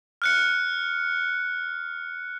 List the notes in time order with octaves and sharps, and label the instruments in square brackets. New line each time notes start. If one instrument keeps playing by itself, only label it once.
[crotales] F6 F#6 C#7